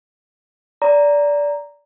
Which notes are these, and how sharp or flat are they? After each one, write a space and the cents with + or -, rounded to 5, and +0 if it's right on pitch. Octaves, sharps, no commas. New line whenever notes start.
D5 -15 A#5 +0